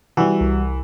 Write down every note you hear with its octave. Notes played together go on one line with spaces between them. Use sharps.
E3 G3 F#4
C2